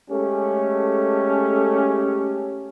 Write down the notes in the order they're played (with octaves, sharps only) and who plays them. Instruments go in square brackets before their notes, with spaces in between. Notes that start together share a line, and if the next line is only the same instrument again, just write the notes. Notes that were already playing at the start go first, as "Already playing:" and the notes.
[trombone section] G#3 A3 C#4 G4 A4